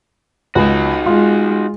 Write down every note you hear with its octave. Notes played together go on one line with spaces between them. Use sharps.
C#2 D#4 F#4
G#3 F4